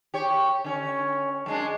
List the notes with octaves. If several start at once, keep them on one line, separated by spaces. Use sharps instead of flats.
G4 C#5
D3 C#4
F#2 G#3 D4